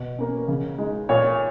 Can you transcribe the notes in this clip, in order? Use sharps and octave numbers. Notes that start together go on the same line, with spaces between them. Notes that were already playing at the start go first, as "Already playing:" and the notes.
Already playing: B2
A#3 C#4
C#3
G#3 D#4
A#2 C#5